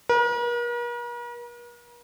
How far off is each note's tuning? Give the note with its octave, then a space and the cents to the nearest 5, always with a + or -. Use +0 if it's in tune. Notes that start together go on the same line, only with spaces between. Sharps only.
A#4 +45